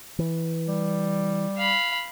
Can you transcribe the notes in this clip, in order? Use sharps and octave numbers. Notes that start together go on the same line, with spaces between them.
E3
G3
F5 B5